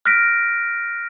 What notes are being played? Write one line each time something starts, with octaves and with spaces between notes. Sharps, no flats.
F6 F#6 A#6 B6 D7